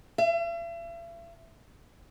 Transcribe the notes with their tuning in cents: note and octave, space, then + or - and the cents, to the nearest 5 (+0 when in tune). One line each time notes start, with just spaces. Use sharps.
E5 +45